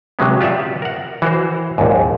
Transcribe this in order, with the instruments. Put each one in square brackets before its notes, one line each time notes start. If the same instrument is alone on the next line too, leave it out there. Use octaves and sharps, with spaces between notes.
[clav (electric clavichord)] C3 F#3 G#3 B3
F4 G4 D5 E5 F#5
A#4 F#5
E3 F#4 A#4 C5
A#1 D#2 G#2